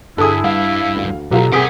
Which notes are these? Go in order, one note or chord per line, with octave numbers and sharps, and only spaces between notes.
G2 D3 E4 G#4 A5 D#6
G2 G3 F5
D2
B1 F#3 F4 G4 A4 A#5
C3 G#4 A#4 F#5 D#6 B6 D7